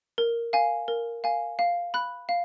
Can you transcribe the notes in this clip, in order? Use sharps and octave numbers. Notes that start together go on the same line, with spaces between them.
A#4
F5 G#5
A#4
F5 G#5
F5
B5 F#6
F5